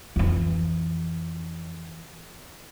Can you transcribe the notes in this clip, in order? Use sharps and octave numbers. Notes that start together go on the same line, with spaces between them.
F2 E3